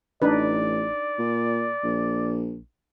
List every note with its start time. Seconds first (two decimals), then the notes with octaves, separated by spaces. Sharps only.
0.22 A1 D4 D#4 B4 D5
1.19 A#2
1.84 A#1